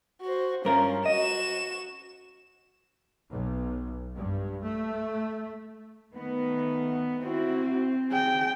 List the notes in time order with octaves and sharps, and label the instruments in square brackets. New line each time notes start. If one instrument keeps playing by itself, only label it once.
[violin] F#4 C5
[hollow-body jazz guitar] G2 A#4 A#5 [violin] C#4 F4
[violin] F#4 E7 [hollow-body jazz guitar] D#5
[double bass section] B1
G2
A3
[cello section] D#3 A3 B3
[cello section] C4 [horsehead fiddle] E4 F#4
[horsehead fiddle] G#4 G5